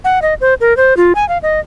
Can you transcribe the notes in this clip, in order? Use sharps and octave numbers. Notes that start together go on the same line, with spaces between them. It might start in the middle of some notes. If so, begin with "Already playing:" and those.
F#5
D#5
C5
A#4
C5
F4
G#5
F5
D#5